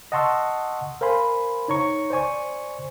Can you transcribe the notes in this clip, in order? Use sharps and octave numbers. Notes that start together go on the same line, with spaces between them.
D#5 F#5 A5 C6 C#6 E6
A#4 C5 F5 G#5 B5 C6
D#4 C#5 A#5 C#6
C5 D5 G#5 C#6